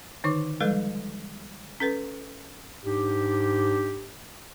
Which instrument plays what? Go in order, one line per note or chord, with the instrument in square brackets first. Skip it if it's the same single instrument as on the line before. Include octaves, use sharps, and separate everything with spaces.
[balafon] D3 D#3 D#4 C#5 D6
F3 G3 G#3 A4 B4
C#4 A4 B4
[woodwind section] G#2 D4 G4